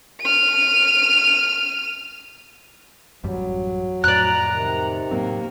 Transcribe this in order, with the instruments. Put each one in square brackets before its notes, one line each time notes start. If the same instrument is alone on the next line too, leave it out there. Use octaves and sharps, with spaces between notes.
[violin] F6 D#7
[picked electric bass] A1 F#2 G3 [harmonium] F#3
[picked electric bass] F2 A2 [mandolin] D5 F#6 [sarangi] A#5
[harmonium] C3 D#3
[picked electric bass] A2 F#3 C4 [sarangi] A#3